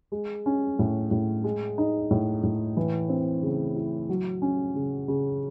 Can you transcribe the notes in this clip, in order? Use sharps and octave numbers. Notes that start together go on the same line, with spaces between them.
G#3
C#4
A2
A2
G#3
D#4
A2
A2
E3
C4
C#3
E4
F#3
C#4
C#3
C#3